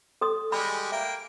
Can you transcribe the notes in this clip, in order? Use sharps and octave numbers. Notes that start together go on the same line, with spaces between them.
A4 C6 D#6
G3 G#3 B5
A#3 E5 G5